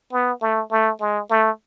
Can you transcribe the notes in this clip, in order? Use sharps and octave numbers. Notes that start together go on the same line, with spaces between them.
B3
A3
A3
G#3
A3